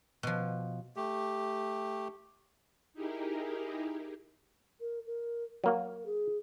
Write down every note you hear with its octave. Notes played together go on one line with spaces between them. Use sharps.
B2 F3
A3 G4
D#4 E4 G4 G#4 A#4
A#4
A#4
F#3 A#3 F#4 A#4
G#4